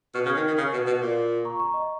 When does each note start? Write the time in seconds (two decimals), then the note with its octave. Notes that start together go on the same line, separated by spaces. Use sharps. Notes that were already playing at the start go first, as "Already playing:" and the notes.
0.14 B2 C#6 F6
0.26 C#3
0.29 F6 G#6
0.36 D#3
0.47 D#3
0.58 C#3
0.73 B2
0.87 B2
1.01 A#2
1.45 A#5 C#6
1.60 A#5 C#6
1.74 D#5